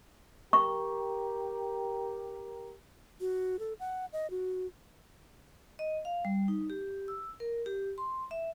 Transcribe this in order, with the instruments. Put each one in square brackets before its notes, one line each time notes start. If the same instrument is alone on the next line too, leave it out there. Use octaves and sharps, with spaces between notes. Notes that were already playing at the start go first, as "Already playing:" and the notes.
[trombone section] G4 A#4 [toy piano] C#6
[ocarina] F#4
A4
F#5
D#5
F#4
[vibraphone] D#5
F5
G3
D#4
G4
E6
A#4
G4
C6
E5